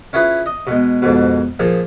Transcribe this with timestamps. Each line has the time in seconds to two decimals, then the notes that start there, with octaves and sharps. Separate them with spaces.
0.13 C#4 E4 F4 G#4 B4
0.46 D#5
0.67 B2 G#3
1.02 F2 G#2 B2
1.59 A#2 F3 G#4